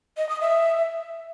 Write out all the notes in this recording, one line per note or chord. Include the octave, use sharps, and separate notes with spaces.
D#5
D#6
E5